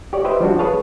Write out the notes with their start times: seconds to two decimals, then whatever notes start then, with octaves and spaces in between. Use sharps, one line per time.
0.13 G4 C#5 D5
0.25 G4 B4 C5 D#5 E5
0.41 F3 G3 D4 F#4
0.59 G#4 B4 C#5 F5 A5